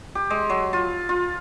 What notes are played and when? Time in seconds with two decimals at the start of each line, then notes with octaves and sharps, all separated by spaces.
0.15 G4
0.30 G#3
0.50 F#3
0.73 F4
1.09 F4